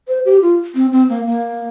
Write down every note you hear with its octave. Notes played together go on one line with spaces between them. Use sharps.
C5
G4
F4
C4
C4
A#3
A#3